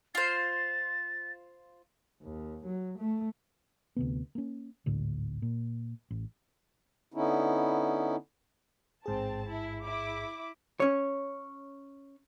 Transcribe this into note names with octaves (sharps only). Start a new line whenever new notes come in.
F4 C5 A6
D#2
F#3
A3
D2 C3 B3
A#3 C#4
G#1 D2 A2 D3
A#2
A1
D3 B3 C#4 D#4 E4
A1 G#2 C4 G#4 A5
E4
E4 D6
C#4 C#5